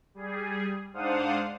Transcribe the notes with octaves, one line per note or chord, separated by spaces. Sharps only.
G3 G#4
G#2 D4 C5 F5 F#5 D#6